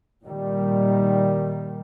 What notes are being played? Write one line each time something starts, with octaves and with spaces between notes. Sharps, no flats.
A#2 D#3 G3